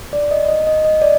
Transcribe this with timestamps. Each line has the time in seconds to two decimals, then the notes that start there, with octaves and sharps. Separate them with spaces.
0.13 D5
0.31 D#5
0.49 D#5
0.67 D#5
0.85 D#5
1.02 D5